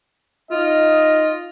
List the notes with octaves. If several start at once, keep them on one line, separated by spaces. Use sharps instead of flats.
D#4 F4 D#5